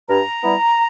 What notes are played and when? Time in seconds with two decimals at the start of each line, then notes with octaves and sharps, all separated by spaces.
0.09 G2 A#5
0.42 G3 B3 E4